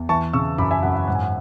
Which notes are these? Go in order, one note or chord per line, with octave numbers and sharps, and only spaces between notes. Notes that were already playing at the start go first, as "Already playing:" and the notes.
Already playing: E2
E3 A5 C#6
C#3 C#6 E6
F#2 B5 D6
E5 G#5
F#2 F#5
F#5
G#2 F#5
G#5
F#5